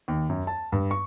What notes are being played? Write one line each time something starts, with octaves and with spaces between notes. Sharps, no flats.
D#2
F#2
A5
G2
C#6